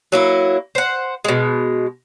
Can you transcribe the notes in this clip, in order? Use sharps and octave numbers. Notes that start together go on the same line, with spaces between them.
F#3 A#3 E4
C5 F#5
B2 G#3